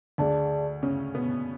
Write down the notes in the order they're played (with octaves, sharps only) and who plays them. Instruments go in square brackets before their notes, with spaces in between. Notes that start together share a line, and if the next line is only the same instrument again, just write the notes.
[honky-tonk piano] D2 D3 [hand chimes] G#4 D5 A5
[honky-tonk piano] C#3 C#4
B2 B3